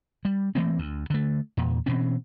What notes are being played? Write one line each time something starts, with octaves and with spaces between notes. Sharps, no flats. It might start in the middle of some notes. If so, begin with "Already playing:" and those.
G3
E3 A3 A#3 C4
D2
D3 A3
E2 A#2
B2 E3 C4 C#4